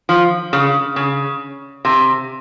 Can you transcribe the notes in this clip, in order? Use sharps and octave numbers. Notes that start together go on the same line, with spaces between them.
F3
C#3
C#3
C3